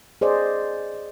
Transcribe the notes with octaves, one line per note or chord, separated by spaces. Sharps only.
G#4 C5 D5 D#5